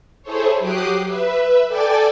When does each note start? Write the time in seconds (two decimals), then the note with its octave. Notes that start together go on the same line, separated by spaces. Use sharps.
0.23 E4 G#4 A4 C5 C#5
0.59 F#3 G4 D6 D#6 F#6 C7
1.05 B4 E5
1.68 A4 D5 G5 G#5 D6 A6